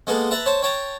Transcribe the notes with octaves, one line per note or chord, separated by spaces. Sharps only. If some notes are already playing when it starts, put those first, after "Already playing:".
G#3 A#3 B3 A4
B4 E5 A5 A#5
C5 C#5 A5
C#5 G5 A5 A#5